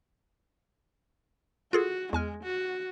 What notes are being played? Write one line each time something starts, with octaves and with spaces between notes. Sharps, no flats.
F4 F#4 G#4 A4
E2 G#3 G#5 F6
F#4